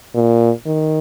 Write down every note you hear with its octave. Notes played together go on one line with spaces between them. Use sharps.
A#2
D#3